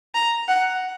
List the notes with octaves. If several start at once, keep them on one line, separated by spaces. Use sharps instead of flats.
A#5
F#5